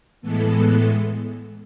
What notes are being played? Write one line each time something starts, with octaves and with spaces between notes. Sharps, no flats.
A2 E3 G#3 B3 A4